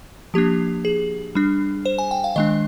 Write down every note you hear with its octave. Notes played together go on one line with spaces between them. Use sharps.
F3 A#3 D4 G4
G#4
G3 D4
C5
G#5
G5
F5
D#3 G#3 D4 D#5